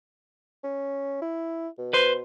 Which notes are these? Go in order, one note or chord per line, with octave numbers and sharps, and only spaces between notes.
C#4
E4
B2
B4 C5